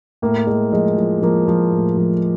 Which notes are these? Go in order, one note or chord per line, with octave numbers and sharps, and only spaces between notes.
A2 A#3
A2 G#3
F3 G#3
F3
F3 A#3
F3
A2
F3